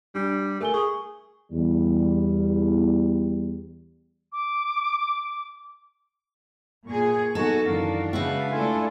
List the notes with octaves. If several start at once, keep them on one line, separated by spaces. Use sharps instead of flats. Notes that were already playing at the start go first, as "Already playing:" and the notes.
G3 D4
A3 A#4 G#5 G7
G#4 C#6
E2 G3
D6
A#2 G#4 C#6
F#3 B3 D#4 F#4 A4 G#5
F#2 D#3 E3 D4 F#4 A#4 F5
C#3 G#3 F#4 B4 E5 F5
A3 D4 E4 F4 A4 G#5